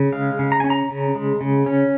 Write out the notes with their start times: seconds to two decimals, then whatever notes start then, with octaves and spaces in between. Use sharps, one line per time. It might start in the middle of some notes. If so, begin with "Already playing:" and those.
Already playing: C#3
0.13 G#3 F5
0.39 C#3
0.52 A#5
0.60 C#4 G#5
0.70 A#5
0.90 C#3
1.15 G#3
1.41 C#3
1.66 C#4